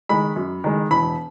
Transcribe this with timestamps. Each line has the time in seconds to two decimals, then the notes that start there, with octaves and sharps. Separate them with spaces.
0.09 D#3 G#3 B5
0.36 F#2
0.64 D#3 G#3
0.91 E1 B5